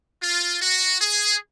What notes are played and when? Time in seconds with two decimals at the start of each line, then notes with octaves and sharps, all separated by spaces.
0.21 F4
0.60 F#4
0.99 G#4